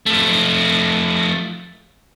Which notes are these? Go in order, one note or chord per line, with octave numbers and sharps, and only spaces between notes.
F3 A3